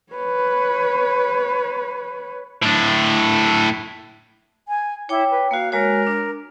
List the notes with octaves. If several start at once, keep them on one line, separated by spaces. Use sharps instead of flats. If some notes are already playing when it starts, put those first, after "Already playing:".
B4 C#5
A2 D4
G#5
E4 C#5 G5 D6
B4
A#3 F#4 F5
G#3 F#4 A#4 C#5
D4